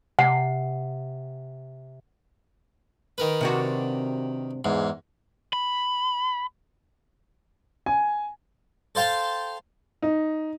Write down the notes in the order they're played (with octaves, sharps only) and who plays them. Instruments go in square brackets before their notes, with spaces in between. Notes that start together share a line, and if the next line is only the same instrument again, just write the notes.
[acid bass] C3 [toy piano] F#5
[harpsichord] D#3 A#4 B4
[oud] C3 D4 F#4
[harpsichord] E2 G#2
[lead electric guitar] B5
[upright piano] G#5
[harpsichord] A4 C5 F5 G5 A5
[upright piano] D#4